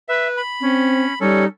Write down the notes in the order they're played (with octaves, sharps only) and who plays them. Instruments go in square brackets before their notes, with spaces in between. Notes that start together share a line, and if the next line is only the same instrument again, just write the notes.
[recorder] B4 [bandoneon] E5
[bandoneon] B5
[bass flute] C4 [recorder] C#4
[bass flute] G3 [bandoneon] C#4 A4 [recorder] D#4